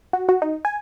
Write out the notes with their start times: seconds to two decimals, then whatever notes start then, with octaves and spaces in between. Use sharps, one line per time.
0.13 F#4
0.29 F#4
0.42 D#4
0.65 G#5